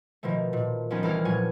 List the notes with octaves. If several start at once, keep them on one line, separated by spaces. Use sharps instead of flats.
B2 D#3 F3 A3
A#2
F3 B3 C#4 D#4
C2 E3 A4 A#4 F6
A#2 F#3 C#5 G#5